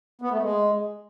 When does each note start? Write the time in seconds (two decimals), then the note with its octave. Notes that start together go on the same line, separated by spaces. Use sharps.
0.21 B3
0.31 A3
0.41 G#3